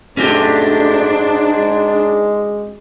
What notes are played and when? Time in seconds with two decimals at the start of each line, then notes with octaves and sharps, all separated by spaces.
0.17 G#2 A3 C#4 D4 F#4 G4
1.51 G#3